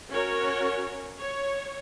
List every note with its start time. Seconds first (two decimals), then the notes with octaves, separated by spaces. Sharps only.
0.10 C#4 F#4 A#4 C#5
1.21 C#5